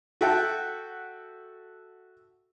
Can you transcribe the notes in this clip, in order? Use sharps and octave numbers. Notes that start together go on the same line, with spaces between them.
F#4 A4 E5 F#5 G5 A5